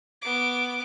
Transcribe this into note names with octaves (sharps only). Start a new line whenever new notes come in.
B3 D6